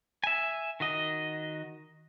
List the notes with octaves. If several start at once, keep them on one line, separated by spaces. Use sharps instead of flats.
E5 G#5
D#3 F#4 D#5